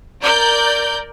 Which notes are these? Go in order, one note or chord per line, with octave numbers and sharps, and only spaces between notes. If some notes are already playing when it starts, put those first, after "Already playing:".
A#4 D5 G6